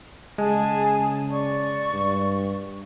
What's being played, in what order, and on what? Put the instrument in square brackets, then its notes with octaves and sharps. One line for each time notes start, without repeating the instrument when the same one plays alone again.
[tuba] C#3 [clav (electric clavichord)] G#3 [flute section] G#4 G#5 A5
[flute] D5 [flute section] C#6
[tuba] G2